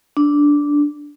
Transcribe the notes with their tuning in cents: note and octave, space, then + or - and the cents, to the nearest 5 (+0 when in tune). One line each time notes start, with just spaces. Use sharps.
D4 -10